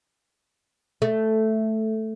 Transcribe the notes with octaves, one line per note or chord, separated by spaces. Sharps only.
A3